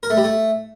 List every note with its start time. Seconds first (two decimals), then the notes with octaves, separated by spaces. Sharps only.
0.03 A#4
0.10 A3
0.17 G3
0.24 A3